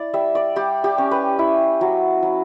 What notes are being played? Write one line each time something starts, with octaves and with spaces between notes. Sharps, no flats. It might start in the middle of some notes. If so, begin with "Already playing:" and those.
Already playing: E4 D5
G3 E5
D5
G3 G4
G4
C#4
B4
E4
F#3
F#3